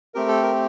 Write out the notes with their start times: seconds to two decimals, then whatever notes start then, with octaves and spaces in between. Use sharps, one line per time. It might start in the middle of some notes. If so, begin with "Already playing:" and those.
0.14 A3 C4 G4 A#4
0.28 A4
0.42 A#4